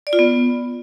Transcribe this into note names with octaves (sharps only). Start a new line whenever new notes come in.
D5
F4
B3